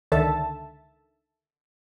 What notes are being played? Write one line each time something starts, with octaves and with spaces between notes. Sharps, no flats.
C#2 D3 D#3 A4 E5 A5